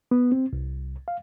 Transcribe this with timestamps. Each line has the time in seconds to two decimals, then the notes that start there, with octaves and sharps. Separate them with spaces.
0.11 B3
0.32 C4
0.53 C2
1.08 F5